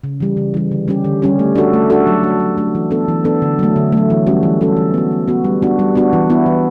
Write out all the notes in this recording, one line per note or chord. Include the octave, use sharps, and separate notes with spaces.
C#3
E3 G3
C#3
E3 G3
D3
G3 C#4 G4
D3
G3 C#4 G4
A3
D4 F#4 A4
A3
D4 F#4 A4
F#3
A3 D4
F#3
A3 D4
E3
B3 D4 A4
E3
B3 D4 A4
D3
F#3 A3
D3
F#3 A3
E3
G3 C#4 F#4 A4
E3
G3 C#4 F#4 A4
E3
B3 F#4
E3
B3 F#4
G3
B3 D4 F#4
G3
B3 D4 F#4
E3
B3 E4
E3